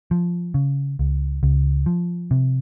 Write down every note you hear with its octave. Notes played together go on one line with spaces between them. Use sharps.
F3
C#3
C#2
C#2
F3
C3